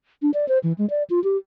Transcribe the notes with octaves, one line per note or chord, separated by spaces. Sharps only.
D4
D5
C5
E3
G#3
D5
F4
G4